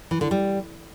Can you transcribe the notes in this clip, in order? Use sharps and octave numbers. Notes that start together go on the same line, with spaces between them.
E3
D3
G3